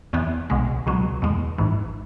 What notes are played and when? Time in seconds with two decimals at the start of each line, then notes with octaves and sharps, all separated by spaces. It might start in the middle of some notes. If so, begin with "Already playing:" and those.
0.13 E2 E3 B3
0.50 B1 B2 G#3
0.86 C#2 B2 F#3
1.22 E2 B2 G#3
1.58 G#1 G#2 E3